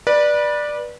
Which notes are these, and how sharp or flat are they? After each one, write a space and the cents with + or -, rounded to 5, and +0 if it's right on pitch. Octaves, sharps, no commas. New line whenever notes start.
B4 -25 D5 +10